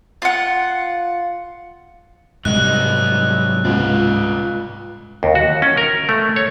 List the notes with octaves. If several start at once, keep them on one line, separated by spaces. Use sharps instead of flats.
F4 F#5
G#2 C3 F#3 G3 B4 D#5 F#6
C#2 F4 B4 D5
D#2
F#4
C#4
A#4
A3
C#5